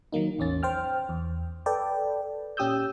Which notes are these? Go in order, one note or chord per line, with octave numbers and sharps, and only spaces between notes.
D#3 F#3 A#3 D#4
A1 E2 C#4 A6
C5 G5 F6
E2
A4 B4 D5 G5
A#2 C#4 G4 D#6 E6 G6